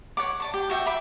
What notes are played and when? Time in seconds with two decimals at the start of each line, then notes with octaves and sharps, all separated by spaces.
0.17 C#5 F#5 D6
0.40 D5 A5 C#6
0.54 G4
0.70 F#4 E5 G5
0.86 E5 B5 D6